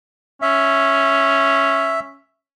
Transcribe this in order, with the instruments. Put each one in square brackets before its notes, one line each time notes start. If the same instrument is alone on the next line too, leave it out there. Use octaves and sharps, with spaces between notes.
[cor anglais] C#4 [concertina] E5